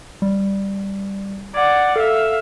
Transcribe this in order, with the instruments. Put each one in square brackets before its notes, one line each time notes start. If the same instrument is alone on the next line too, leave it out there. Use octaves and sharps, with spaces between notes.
[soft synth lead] G3
[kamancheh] D5 F#5 [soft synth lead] G#6
[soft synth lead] A4 [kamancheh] E5 F5